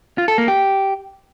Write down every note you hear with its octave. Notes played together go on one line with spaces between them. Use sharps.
F4
A4
A#3
G4